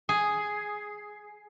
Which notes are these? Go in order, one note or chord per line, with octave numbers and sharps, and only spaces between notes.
G#4